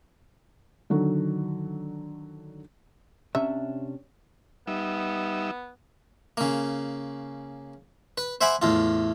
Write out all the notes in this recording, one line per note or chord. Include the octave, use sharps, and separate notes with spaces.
D3 D#3 F#3 F#4 A4
C3 C#4 D4 E5
G3 B3 D#4 E5
C#3 A#3
B4
C5 E5 F#5 G#5 B5 D6
E2 A2 F4